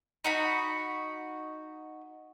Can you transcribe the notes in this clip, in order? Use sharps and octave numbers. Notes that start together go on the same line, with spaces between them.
D#4 F#4 B5